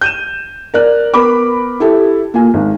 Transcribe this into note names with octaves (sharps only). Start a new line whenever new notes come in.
G6 D#7 E7
A#4 D5 F#6
B3 A#4 B5 D6
E4 G4 A4
A#3 F4 G#5
G#1